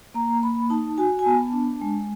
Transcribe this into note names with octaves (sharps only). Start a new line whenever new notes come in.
A#3 A#5
A#3 B5
D#4 A5
F#4 G#5
G#5
B3 A5
D4
G#3